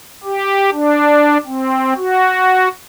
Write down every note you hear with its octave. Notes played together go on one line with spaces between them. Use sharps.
G4
D4
C4
F#4